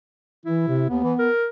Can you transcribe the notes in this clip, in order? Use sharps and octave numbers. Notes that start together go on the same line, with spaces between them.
E3 E4
C3
D#2 B3
E3
A#4